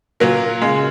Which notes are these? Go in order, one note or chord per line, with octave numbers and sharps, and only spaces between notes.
A#2 F#3 A#3 A#4
C#3 G#3